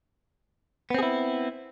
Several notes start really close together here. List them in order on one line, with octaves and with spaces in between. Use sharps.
B3 C4 G#4 E4